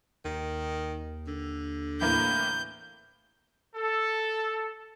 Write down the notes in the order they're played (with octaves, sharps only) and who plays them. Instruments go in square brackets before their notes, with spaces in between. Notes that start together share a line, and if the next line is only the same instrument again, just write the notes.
[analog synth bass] D#2 [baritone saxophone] D#3
[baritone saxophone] D3
[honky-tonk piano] A2 E3 A#3 [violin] G6
[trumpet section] A4